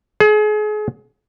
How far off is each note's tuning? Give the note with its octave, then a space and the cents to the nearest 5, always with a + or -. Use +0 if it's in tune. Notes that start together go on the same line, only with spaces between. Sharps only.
G#4 +35